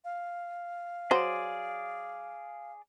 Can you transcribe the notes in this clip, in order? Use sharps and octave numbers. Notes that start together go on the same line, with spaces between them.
F5
F#3 G#4 C5 D5